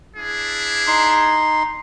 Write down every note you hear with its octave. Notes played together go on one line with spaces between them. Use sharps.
D4 E4 G#4
D#4 C6